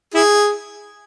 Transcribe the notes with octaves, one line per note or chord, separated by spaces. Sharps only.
E4 G#4